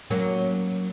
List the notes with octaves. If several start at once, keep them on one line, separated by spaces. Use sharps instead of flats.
F#3 A#3 C#4